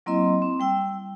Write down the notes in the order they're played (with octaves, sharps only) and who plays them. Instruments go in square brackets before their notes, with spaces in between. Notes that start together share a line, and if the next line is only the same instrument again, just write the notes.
[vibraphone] F#3 A#3 C4 E4 D#5 C6
C4
G3 G5 E6